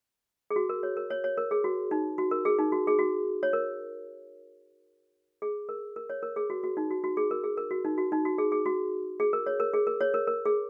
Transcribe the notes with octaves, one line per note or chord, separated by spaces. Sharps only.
G#4
F#4
A#4
C#5
A#4
C#5
C#5
A#4
G#4
F#4
D#4
F#4
A#4
G#4
D#4
F#4
G#4
F#4
C#5
A#4
G#4
A#4
A#4
C#5
A#4
G#4
F#4
F#4
D#4
F#4
F#4
G#4
A#4
G#4
A#4
F#4
D#4
F#4
D#4
F#4
G#4
G#4
F#4
G#4
A#4
C#5
A#4
G#4
A#4
C#5
A#4
A#4
G#4